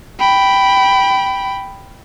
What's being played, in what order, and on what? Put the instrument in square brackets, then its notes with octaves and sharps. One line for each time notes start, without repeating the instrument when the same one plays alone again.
[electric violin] G5 B5